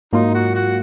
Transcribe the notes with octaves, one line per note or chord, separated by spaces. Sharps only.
G#2 F#3 A#3 D#4 F4
F#4
F#4